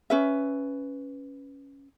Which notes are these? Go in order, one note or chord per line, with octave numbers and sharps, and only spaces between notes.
C#4 B4 E5